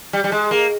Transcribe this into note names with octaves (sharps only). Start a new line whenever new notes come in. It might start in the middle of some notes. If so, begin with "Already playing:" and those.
G3
G3
G#3
A#3